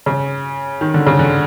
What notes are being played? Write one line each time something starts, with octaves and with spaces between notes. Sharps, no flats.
C#3
D#3
D3
C#3
D3